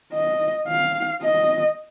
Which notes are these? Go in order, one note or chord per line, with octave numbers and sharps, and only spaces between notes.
D#5
F5
D#5